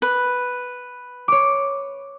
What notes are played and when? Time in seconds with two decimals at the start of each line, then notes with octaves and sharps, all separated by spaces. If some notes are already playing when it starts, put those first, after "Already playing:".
0.02 B4
1.28 C#5 D6